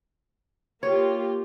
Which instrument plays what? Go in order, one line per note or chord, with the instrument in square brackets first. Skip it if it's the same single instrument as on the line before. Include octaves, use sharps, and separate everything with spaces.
[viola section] A#3 F4 G4 [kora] C#5